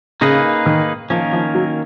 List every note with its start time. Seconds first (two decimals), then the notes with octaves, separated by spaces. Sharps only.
0.21 C#3 A#3 D#4 G#4 B4
0.66 D#3
1.10 D#3 F3 A#3 C#4
1.33 F3
1.55 F#3